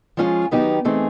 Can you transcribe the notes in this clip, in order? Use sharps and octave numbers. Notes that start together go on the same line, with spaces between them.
F3 G#3 C#4 F4 G#4
D#3 F#3 B3 D#4 G4
E3 A3 C4 D#4 G#4